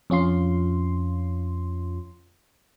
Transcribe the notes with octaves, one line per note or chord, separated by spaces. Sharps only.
F2 C#4 F4 C6